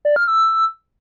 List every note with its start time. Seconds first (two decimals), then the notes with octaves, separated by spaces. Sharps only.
0.05 D5
0.16 F6
0.28 E6